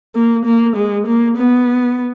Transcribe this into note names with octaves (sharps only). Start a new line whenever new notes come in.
A#3
A#3
G#3
A#3
B3